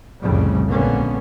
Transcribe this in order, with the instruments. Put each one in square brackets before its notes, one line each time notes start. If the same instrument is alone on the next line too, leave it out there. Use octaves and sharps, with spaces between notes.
[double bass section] C2 F2 A2 C#3 G3
A#1 G#2 D3 A#3 B3 C#4